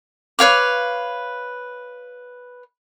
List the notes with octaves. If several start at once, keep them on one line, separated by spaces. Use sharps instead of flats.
B4 C#5 F5 D6